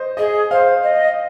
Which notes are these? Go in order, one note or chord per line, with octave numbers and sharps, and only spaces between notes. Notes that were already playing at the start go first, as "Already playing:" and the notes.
Already playing: C5 D#5
G#4 D#5
C5 F5
D#5